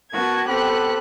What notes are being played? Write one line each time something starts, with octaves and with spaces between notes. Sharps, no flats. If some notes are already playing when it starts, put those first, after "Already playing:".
B3 F#4 A#4 A5 G#6
B3 C4 G4 A4 B5 F#6